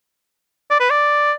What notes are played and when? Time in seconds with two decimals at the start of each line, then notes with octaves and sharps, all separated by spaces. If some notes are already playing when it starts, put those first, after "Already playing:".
0.71 D5
0.80 B4
0.90 D5